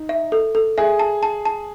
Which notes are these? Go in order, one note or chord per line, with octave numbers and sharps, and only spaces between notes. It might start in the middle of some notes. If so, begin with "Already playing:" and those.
Already playing: D#4
E5
A4
A4
G#4 E5
A5
A5
A5